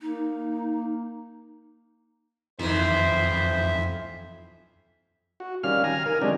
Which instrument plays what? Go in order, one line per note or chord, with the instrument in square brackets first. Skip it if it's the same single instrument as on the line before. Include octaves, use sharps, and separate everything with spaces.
[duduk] A#3 [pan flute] D#4
[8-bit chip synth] F2 [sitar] D#3 E3 [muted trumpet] C5 [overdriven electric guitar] E5
[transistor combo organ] F#4
D#3 G3 C#4 F5 F6
G#5 A#5 F6
D#3 A#4 G#5
F#3 G#3 C4 D4 D#4 G4